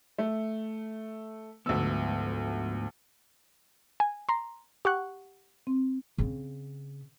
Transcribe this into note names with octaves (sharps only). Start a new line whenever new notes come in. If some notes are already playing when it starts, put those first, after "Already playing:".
A3
D2 G#2 F3 B3 E6
G#5
A#5 C6
G4 F#5 C#6 F#6
C4
C#3 C4